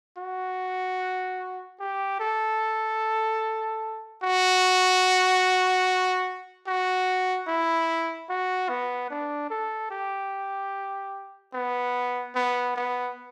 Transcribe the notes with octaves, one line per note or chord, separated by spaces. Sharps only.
F#4
G4
A4
F#4
F#4
E4
F#4
B3
D4
A4
G4
B3
B3
B3